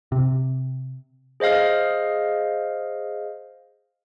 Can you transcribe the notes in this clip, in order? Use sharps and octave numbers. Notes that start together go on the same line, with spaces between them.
C3
G#4 C5 D#5 F5 F6